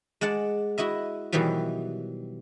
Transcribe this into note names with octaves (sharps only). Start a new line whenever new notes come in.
G#3 D5 F#5 A5
E4 F#4 D#5 E5
B2 D#3 E3 F#3 G3